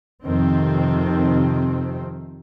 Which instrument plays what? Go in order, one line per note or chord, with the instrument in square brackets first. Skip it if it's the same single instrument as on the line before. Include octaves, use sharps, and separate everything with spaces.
[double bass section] F2 C3 D#3 C4